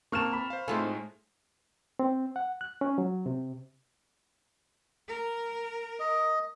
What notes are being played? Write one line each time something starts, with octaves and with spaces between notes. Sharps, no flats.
A#3 C4 A5 C#6 F6 E7
B5
C5 F5
A2 G#3 A3 C4 D#4 F4 A4 G#5
C4
F#5
F#6
C#4
F#3
C3
A#4
D#5